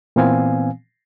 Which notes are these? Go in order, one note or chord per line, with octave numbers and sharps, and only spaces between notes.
A#2 E3 B3 C4 F5 G#5